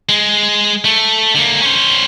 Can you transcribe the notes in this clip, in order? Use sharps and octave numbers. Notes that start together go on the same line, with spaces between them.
G#3
A3
D3 A#3
C#4 C5